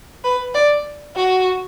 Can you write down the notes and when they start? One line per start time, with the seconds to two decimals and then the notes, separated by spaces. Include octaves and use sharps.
0.24 B4
0.54 D5
1.16 F#4